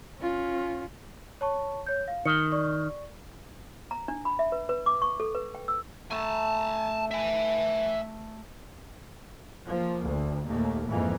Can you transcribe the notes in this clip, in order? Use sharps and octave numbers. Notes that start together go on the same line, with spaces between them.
C#4 F4
C#5 A5 C#6
C#5 G6
F5
D#3 C#7 G7
D5 C#6
A#5
D4
B5
E5
B4
B4
D6
C#6
A4
B4
G5
E6
A3 G#5 A5
E5 G#5
F3 A#3
D2
D#2 A#2 A3 A#3
F2 G#2 E3 F3 A#3